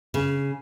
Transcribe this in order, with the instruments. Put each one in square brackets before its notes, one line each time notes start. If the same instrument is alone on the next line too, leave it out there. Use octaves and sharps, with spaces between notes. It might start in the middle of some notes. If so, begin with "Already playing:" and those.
[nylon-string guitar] C#3